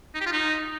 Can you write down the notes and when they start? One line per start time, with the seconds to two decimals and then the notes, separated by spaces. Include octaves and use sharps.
0.15 D#4
0.20 G4
0.26 F4
0.32 D#4